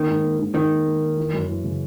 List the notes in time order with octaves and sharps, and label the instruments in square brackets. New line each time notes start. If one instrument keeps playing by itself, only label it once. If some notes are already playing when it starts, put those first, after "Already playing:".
Already playing: [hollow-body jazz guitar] D#3 [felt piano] A#3
[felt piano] G#2
A#3
G#2
[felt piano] G#2 [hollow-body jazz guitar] D#3
[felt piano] A#3
A#3
A#3
E3
F#2
E3
C#3